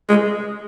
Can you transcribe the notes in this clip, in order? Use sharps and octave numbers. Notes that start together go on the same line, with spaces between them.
G#3